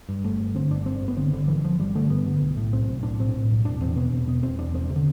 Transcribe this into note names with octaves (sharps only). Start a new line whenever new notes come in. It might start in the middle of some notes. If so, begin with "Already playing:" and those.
G2
G1 A3
G1
D3 C4
G1 D4
G2 C4
G1
B3
D3 C4
G1 D3
D3 E3
G1 F3
G1 G3
D3 A3
G2 B3
D3
B1
A2
B1 C4
B1
A2 D4
B1 C4
A2
B1
E1 D4
E2 C4
B2 B3
E2
B2 B3
E1 C4
E2 D4
E1 C4
C3
D3